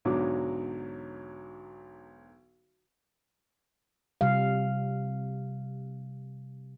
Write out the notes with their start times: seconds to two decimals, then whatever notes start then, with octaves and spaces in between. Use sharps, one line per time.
0.05 B1 G#2 D3 F#3 D6
4.21 C3 G3 G4 F5